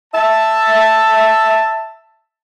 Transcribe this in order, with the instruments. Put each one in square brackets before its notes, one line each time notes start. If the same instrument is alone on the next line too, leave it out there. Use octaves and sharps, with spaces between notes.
[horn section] E5 A5